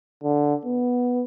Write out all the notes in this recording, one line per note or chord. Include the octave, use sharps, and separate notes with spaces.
D3
B3